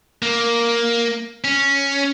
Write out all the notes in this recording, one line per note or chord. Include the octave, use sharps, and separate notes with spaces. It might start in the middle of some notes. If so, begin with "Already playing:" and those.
A#3
C#4